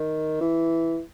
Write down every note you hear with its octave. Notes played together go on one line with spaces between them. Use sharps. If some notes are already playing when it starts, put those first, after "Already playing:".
Already playing: D#3
E3